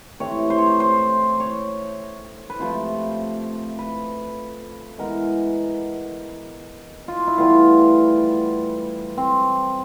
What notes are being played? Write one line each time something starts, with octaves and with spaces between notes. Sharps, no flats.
C3 E3 A3 C4 C#5
C5
C#5
C5
C5
C#5
B4
C3 F3 A3 C5
B4
E3 G#3 B3 A#4
F4
E4
A2 E3 G3 B3 F4
C4